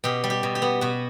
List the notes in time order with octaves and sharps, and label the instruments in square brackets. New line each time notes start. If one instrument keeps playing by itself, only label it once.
[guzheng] B2 G4
G3
G4
B2
G4
B3
B2 F#4